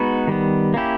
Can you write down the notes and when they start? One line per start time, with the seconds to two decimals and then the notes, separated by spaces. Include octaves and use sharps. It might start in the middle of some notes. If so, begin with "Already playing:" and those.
Already playing: G#3 B3 D#4 F#4 B4
0.28 D#3 G3 B3
0.74 A#3 C#4 E4 G4